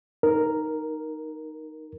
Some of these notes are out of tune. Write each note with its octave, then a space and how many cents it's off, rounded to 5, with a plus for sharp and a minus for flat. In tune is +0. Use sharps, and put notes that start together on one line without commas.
D#4 +0 A#4 +0